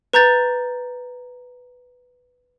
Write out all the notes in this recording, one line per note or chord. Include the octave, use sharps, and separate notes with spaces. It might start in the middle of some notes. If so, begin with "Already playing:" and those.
B4 A#5 G6 A6